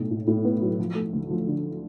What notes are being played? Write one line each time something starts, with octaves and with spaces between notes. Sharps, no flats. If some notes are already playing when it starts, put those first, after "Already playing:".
Already playing: B1 A2
A2
A2
B3
F#3
F3
A3
D2
F3
D3